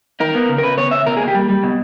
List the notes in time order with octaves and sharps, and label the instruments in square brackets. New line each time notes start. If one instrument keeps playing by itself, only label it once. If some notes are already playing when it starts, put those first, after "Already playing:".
[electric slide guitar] D#4 A#4
B3
C#3
A#4
C#3 B4
B3 C#5
C#3 E5
B2 A#4
G#4
A#3
G4
G3
G3
B2